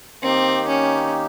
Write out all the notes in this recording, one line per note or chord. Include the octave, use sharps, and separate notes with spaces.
D#3 A#3 C4 D#4 G4
C#4